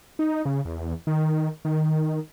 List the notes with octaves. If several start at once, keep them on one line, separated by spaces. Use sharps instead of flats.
D#4
C#3
E2
D#3
D#3